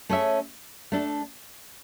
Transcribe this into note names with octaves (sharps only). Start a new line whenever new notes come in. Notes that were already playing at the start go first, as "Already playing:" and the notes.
A3 C#4 G#4 C#5 E5
A3 D4 A4